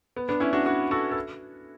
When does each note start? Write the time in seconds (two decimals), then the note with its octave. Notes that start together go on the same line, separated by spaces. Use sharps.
0.16 B3
0.29 B3 D4
0.40 C#4 E4
0.53 D4 F#4
0.66 D4 F#4
0.91 F#4 A4
1.11 A4